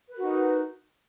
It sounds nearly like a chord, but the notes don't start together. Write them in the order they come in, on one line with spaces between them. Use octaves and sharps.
B4 A#4 F#4 D#4